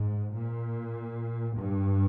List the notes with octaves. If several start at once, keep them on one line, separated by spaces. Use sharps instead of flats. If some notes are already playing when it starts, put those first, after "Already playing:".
Already playing: G#2
A#2
G2